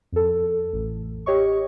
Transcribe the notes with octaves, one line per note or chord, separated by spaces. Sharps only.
F2 A4
A1
G4 C#5 D#5 C#6